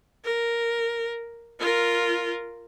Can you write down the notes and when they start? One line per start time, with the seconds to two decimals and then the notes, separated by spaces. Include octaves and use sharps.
0.25 A#4
1.60 F4 A#4